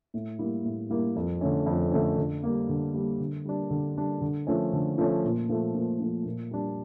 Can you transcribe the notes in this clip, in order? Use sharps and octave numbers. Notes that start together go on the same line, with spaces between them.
A2
G3 A#3 E4
A2
G3 A#3 E4
F2
D3 A3 C#4
F2
D3 A3 C#4
D3
G3 A#3
D3
G3 A#3
D3
G3 D4
D3
G3 D4
D3
F3 A3 C#4
D3
F3 A3 C#4
A#2
F3 A3
A#2
F3 A3
A#2
G3 D4